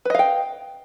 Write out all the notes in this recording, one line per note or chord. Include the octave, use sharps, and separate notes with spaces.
B4 D#5 F5 G5